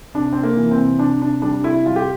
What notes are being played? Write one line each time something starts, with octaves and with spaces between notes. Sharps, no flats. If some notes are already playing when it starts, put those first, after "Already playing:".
C3 D4
C3 C4
A#3
E3
C4
C3
C3 D4
C3 D4
G3 D4
C3 E4
G3 F4
G4